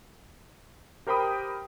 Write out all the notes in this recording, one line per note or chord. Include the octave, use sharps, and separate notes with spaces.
G4 A#4 C5 G5 B5 D#6